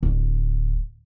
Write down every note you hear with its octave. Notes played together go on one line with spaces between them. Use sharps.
D1